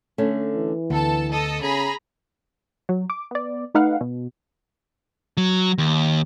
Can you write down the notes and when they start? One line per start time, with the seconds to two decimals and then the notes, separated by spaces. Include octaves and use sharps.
0.18 D3 A3 C#4
0.56 E3
0.90 D2 B3 A4 A5
1.29 A4 D#5 D#6
1.62 C#3 G#4 A#5 B5
2.89 F#3
3.10 D6
3.31 B3 D5
3.74 A3 D#4 B4 F5 F#5
4.01 B2
5.37 F#3
5.78 D#2